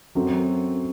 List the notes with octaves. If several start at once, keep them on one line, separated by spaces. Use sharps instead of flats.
F#2 F#3 C4 F#4 A4